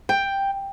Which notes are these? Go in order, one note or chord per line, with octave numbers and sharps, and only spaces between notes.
G5